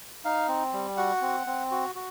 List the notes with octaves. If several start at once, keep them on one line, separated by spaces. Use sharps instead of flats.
D#4 F5
C4
G3
F#4 F#5
C4
C4
F#4
F#4